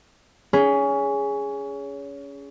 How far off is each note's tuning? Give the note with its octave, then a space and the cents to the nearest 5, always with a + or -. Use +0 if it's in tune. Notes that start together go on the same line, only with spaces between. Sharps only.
C#4 +25 G#4 +0